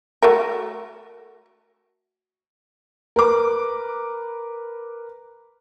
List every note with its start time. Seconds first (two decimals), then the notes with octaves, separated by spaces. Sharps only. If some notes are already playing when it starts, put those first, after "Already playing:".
0.23 A3 F#4 A#4
3.16 A#4 B4 D6